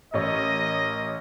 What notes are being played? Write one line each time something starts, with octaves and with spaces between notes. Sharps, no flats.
A1 A#4 C#5 D#5